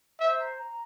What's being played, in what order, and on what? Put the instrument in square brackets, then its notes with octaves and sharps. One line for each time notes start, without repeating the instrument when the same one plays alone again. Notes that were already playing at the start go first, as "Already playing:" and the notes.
[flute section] C5 [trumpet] E5
[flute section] A#5
A#5